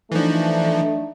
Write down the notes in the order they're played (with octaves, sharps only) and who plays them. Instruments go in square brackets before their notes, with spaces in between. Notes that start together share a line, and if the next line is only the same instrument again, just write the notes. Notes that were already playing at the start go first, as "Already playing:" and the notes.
[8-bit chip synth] E3 F3 [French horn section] A3 D4 D#4